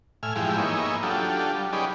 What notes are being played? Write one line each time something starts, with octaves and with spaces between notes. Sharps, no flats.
A2 E5 G#5 F6
G#2 E3 F3 G#3 E4 G4
A#3 B3 D#4 G#4 C#5 E5
F#3 D4 F4 G4 A4
G3
C#4 D#4 G4 G#4 B4 D5